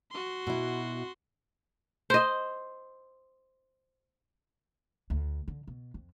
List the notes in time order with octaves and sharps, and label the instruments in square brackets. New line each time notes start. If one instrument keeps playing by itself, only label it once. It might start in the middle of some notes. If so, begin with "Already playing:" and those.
[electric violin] F#4 C6
[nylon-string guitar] B2 E4
[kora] C5 D#5
[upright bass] D2
D3
B2
F2